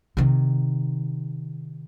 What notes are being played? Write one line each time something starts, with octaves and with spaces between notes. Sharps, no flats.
C3 D#3